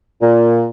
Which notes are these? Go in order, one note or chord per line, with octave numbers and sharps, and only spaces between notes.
A#2